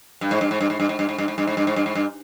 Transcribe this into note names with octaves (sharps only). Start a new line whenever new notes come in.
G2
G#2
G2
G#2
G2
G#2
G2
G#2
G2
G#2
G2
G#2
G2
G#2
G2
G#2
G2
G#2
G2